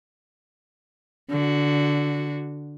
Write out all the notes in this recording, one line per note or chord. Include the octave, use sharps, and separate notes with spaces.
D3 F#4